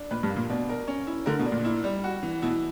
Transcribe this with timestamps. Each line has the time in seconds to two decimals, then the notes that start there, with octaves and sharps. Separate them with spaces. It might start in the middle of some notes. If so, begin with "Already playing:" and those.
Already playing: D4
0.11 A#2 B4
0.23 G2
0.30 A#3
0.36 A#2
0.49 B2 D4
0.69 A#4
0.88 C#4
1.07 E4
1.26 D3 A#4
1.39 B2
1.45 D4
1.52 A#2
1.64 E4
1.84 G3
2.04 F#4
2.23 E3
2.42 B2 E4